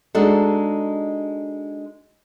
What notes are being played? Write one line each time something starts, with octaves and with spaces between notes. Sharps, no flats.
G#3 D4 D#4 F#4 A4